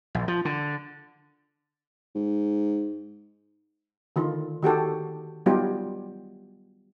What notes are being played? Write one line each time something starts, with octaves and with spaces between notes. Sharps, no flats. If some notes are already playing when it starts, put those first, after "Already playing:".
A#1
F3
D3
G#2
D3 D#3 F4
D#3 F#4 G4 A4
F#3 G3 B3 D#4 F4 G4